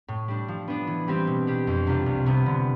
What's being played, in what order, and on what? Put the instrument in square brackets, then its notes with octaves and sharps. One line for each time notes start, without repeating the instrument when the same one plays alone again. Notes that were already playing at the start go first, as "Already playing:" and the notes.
[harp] A2
G3 D4
F3
B3 D4
E3
G3 C4 G4
B2
G3 D4 G4
F2
C3 G3 D4 F4
C2
C3 G3 B3
D3